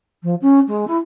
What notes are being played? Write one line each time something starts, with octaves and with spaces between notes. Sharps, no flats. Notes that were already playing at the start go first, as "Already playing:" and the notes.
F3
C#4
G#3
E4